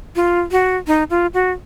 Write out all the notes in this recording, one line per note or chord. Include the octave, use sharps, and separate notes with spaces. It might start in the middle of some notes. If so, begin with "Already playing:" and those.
F4
F#4
D#4
F4
F#4